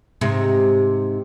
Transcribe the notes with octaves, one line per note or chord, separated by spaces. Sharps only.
G#2 C3